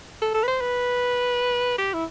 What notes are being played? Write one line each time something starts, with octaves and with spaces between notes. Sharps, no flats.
A4
A4
B4
C5
B4
G4
E4